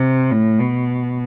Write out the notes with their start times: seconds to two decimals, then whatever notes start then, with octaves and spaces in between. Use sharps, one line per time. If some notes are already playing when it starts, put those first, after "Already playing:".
Already playing: C3
0.32 A2
0.60 B2